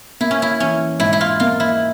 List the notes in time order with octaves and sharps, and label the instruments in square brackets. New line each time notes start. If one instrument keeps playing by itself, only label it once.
[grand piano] A#3 [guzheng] E4
[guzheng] C#4
E4
[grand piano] E3 [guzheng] C#4
[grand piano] G#2 [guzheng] E4
[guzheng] E4
F4
[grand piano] A#3 [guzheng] F4
[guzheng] E4